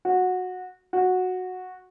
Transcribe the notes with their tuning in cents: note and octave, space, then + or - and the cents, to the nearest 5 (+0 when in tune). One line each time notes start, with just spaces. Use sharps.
F#4 -15
F#4 -10